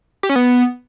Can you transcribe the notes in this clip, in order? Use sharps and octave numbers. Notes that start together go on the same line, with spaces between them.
G4
C#4
B3